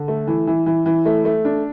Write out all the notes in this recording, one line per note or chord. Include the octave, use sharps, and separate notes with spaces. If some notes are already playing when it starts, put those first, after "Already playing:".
Already playing: D3
A3
E3
E3
E3
E3
A3
A3
D4